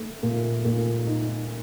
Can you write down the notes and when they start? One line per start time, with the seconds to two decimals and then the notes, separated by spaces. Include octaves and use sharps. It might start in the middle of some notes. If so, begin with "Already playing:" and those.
Already playing: A3
0.23 A#2
0.65 A#2
1.06 D#4